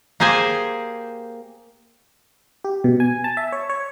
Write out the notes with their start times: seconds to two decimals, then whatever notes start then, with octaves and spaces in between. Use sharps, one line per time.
0.20 A#3 G4 G#4 C5 G#5
2.64 G4
2.84 B2
3.00 G#5
3.24 A5
3.37 E5
3.52 C#5
3.70 C#5